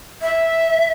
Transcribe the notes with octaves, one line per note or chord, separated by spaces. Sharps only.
E5